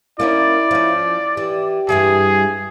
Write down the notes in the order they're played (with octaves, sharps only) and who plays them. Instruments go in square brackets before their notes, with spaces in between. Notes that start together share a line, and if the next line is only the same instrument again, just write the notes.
[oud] A#3 C#4 D#4 [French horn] E4 [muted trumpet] D5
[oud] F3 C#4
[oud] E3 [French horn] G4
[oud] G2 E3 G3 [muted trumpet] G#4